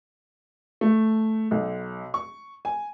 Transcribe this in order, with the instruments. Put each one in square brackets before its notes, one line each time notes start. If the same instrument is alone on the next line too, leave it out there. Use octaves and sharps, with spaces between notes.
[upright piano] A3
B1
C#6
G#5